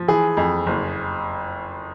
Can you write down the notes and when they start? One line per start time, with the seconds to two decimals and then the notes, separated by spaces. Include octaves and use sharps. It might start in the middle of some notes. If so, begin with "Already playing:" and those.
Already playing: F3
0.08 E3 G#4
0.37 F2
0.66 F#1